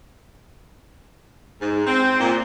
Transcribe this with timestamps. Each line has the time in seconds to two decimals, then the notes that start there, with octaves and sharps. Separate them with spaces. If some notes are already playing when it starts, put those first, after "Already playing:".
1.61 G#2
1.87 C4
2.20 A#2